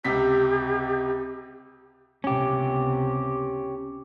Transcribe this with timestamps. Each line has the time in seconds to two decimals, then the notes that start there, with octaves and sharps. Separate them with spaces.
0.04 C#2 C3 G4 B6
2.24 C#2 C3 B3 C#4 G4